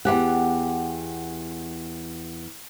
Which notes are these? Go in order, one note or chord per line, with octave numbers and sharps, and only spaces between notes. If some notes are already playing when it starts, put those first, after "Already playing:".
E2 C#3 G4 F#5